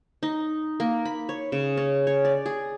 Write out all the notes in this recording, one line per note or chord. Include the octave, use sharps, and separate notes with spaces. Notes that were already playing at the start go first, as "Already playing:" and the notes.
D#4
A#3
B5
C#5
C#3
C#4
C#5
D5
G#4